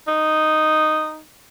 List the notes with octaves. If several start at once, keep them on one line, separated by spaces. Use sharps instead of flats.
D#4